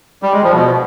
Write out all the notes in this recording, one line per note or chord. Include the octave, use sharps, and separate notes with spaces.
G3
G#3
F3
B2